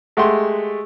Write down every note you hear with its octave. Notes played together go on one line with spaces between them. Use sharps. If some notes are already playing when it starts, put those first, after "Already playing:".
G#3 A3 G4 F#5 G5 C6